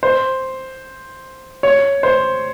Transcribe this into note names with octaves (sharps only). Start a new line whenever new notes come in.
C5
C#5
C5